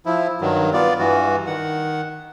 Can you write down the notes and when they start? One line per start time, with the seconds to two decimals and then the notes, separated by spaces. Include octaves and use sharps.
0.06 F3 E4
0.41 G2 D#3 F#3
0.73 B3 F4 D5
0.99 G2 E3 F#4
1.47 D#3 F#5